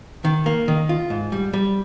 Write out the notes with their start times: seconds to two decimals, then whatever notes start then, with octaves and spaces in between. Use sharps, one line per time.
0.25 D#3
0.46 A#3
0.68 D#3
0.89 F4
1.10 G#2
1.32 G3
1.53 G3